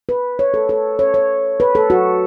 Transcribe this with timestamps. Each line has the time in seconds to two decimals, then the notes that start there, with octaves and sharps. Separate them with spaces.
0.09 B4
0.39 C#5
0.54 A4
0.69 A4
0.99 C#5
1.14 C#5
1.60 B4
1.75 A4
1.90 F#4